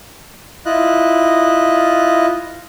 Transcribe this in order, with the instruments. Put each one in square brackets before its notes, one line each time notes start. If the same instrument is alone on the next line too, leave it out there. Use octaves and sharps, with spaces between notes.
[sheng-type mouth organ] E4 F4 D#5 F#6